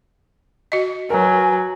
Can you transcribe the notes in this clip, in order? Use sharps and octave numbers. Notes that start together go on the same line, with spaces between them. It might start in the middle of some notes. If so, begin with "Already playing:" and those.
F#4 D#5
F#3 A#4 B4 G#5